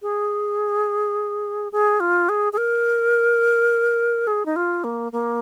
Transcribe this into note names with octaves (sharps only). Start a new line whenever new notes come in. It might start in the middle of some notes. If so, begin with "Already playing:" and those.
G#4
G#4
F4
G#4
G#4
A#4
G#4
D#4
F4
A#3
A#3